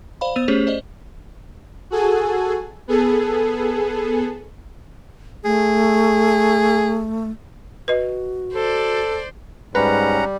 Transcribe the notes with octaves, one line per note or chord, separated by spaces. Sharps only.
C5 D5 F5 B5
B3 C5 E6 D#7 F7
A3 C#4 G4 G#4 C5 C#5
C5 D5 D#5
F#4 G#4 A4 G#5
B3 G#4 A4
A3 G#4
F#4 B4 D#5
A4 C5 D5
G#2 G3 C#4 B4 F#5 A#5